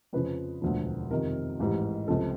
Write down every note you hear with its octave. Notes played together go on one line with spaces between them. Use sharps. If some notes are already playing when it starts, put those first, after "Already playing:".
F2 C#3 F3 B4
E1 D2 D3 F3
F2 C3 D#3 A#4
A1 G#2 E3 G3
C#2 C3 F3 A4